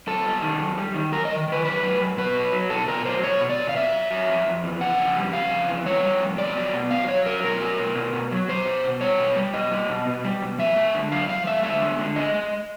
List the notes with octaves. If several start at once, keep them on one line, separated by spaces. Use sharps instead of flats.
F#2 A4
G3
D#3
F#2
G3
D#3
F#2 A#4
D#5
D#3
D#3 B4
F#2 B4
F#2
F#2
B2 B4
F#3
F#3
B2 A4
B2 A#4
F#3 C5
B2 C#5
B2
D5
B2
F5
F#3 E5
F#3
F#3
F2
F2
E3
C#3 F#5
F2
G3
C#3 F5
F2
E3
G3 C#5
G3
F2
B2 D5
F#3
B2
F#3 F5
F#3 C#5
F#3 A#4
B2 A#4
F#3
B2
B2
B2
F#3
B2 C5
B2
B2
G3 C#5
B2
G3
B2 D#5
G3
B2
B2
G3
B2
F3 E5
G#3
D3
F#2 F5
F3 F5
G#3 E5
D3 E5
G#3
D3
G#3 D#5
G#3